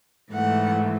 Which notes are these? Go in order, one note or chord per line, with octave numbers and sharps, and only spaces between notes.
G#2 E3 A3 F#5